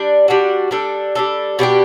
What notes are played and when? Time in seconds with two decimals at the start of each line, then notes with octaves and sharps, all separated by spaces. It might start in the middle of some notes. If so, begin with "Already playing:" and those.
Already playing: G3 D4
0.28 G3 D4 F#4
0.71 G3 D4 A4
1.15 G3 D4 A4
1.59 B2 G3 D4 G4